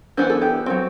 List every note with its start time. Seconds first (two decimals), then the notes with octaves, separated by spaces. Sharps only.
0.17 E3 B3 D4 C5
0.30 A4
0.42 G4
0.66 F#3 C4